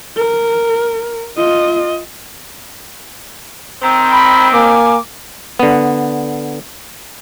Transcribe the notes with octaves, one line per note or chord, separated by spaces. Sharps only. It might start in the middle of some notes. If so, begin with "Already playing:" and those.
A#4
F4 D#5
D#3 C4 A#5
B5
A#3 G#5 D6
D3 B3